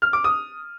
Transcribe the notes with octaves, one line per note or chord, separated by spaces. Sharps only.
F6
D6
D#6